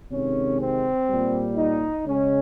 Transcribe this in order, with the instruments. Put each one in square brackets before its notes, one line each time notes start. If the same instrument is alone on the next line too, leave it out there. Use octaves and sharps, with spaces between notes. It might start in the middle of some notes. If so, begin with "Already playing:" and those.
[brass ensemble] C3 D#3 G#3 C#4
C4
A#2 G3
D#4
C#3 G#3 C#4